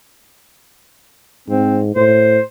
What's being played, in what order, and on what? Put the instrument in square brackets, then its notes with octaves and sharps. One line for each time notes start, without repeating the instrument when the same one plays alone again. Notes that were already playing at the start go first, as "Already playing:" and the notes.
[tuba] G#2 [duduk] C4
[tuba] A2 [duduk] C5